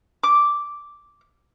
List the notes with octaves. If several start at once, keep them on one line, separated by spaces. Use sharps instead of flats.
D6